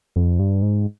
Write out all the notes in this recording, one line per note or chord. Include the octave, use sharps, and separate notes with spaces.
F2
G2
G#2